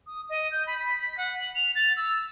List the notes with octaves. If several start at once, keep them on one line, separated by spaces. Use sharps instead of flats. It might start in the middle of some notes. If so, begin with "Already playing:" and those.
D#6
D#5
G6
B5
B6
B6
F#5
F#7
F7
A6
E6